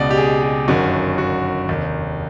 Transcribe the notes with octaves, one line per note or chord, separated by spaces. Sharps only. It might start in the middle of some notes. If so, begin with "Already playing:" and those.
Already playing: C#2 B2 D5 D#5
G4
G#4
G4
G1 F#2 D#3 F#4
F#4
F1 D#2 D#3